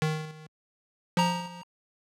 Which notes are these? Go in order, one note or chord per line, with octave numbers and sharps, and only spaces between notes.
D#3
F3 A#5